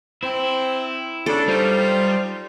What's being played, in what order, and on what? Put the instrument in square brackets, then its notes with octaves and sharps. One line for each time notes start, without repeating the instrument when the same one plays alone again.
[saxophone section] C4 [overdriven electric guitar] E4
[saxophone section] C#3 D4 [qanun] A4
[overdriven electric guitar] G3 [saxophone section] D#4 F4 C5